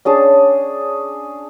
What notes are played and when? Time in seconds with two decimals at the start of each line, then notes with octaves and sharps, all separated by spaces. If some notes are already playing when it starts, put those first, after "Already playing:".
0.05 C#4 D4 G#4 A5